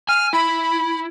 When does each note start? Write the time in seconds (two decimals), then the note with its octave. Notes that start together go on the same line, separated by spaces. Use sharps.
0.09 G#5 F6
0.33 E4 B5